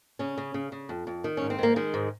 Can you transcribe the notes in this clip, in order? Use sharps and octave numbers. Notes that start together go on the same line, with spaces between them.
C#3 C#4
C#3
C#3
C#3
F2
F2
D#3
G#2 C#4
C4
D#3 A#3
D#3 G#3
G#2